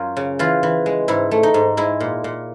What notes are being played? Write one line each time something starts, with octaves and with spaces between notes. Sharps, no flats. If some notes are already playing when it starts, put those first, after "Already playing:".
Already playing: F#2 F4
C#3
E3 F4
E3
G#3
G#2 E4
A3
D#4
G#2
G#3 E4
A#2
A#2